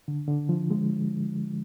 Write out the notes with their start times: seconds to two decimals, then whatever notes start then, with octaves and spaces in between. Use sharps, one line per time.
0.08 D3
0.28 D3
0.49 F3
0.71 G#3